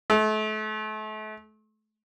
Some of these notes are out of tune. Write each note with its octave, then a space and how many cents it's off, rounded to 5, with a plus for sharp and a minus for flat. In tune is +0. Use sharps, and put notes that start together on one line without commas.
A3 -35